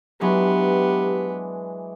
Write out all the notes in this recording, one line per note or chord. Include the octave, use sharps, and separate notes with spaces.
E3 F#3 G#3 B3 D4 G4